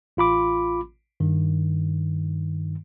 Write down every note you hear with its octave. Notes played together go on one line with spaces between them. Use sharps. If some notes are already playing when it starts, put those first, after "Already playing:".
A1 F4 B5 D6
G2 D#3